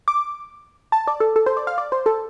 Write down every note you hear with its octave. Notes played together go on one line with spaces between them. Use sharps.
D6
A5
D5
A4
A4
C5
D5
F5
D5
C5
A4